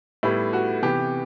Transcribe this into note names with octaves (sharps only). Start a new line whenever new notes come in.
A2 G3 B3 E4
F#4
C3 E3 B3 G4